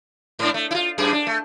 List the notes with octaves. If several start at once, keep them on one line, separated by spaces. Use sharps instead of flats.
G#2 D4
A3
E4 F4
F#2 A2 G#4
D4
A3